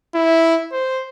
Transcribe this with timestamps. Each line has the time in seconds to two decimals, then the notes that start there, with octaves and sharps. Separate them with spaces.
0.15 E4
0.72 C5